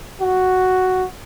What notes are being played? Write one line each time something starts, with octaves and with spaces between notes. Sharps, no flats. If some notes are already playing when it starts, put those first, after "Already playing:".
F#4